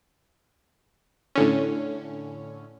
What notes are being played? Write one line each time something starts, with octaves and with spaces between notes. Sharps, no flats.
A2 D3 C#4